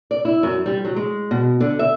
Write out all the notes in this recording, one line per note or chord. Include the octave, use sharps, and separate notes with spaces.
D5
E4
F#2
G3
F#3
G#3
B2
D3
E5